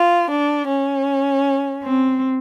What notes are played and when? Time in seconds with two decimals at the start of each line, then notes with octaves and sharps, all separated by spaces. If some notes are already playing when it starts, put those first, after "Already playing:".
Already playing: F4
0.29 D4
0.67 C#4
1.83 C4